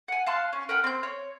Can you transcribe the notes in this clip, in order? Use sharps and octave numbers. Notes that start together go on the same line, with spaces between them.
F#5 G#5
F5 A5 C6 F#6
C#4
A#4 B4 F#5 G5
C4 C6 G6
C#5